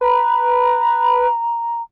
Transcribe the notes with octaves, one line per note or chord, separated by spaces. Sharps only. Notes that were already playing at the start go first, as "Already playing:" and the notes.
B4 A#5